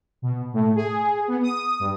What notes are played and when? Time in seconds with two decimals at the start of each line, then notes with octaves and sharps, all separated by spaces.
0.22 B2
0.54 A2
0.75 G#4
1.28 B3
1.43 D#6
1.79 G2